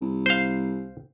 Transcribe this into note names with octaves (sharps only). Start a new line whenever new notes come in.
C2
C5 F5